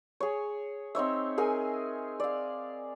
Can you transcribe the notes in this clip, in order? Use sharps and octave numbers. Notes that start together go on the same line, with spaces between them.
G#4 C#5
C4 D#4 C#5 E5
G#4 A#4 G#5
D5 F5